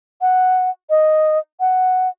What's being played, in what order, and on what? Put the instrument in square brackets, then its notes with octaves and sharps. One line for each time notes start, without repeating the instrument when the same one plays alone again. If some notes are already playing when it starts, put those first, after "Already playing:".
[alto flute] F#5
D#5
F#5